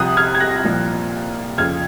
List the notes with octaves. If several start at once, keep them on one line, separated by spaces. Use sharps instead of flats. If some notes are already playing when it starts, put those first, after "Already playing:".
Already playing: C2 C3 F3 D#6 F#6
F6 G#6
G#6
F#6 A#6
C2 A#2 F3
F2 C#3 F3 F6 G#6